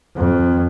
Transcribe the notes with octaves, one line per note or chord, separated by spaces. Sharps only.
F2